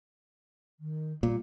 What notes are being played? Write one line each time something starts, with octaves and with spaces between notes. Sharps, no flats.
D#3
A#2 G3